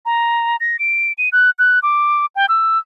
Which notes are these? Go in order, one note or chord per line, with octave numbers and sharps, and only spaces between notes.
A#5
A#6
D7
D#7
F#6
F#6
D6
G5
E6